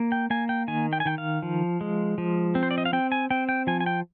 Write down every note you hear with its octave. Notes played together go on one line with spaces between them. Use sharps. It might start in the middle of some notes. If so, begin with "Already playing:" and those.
Already playing: A#3
G5
A#3 G#5
G5
D#3 G#5
G5
G#5
D#3 G5
F5
F3
G#3
F3
C4
C5
D5
D#5
F5
C4 G5
G#5
C4 G5
G5
F3 G#5
G#5
G5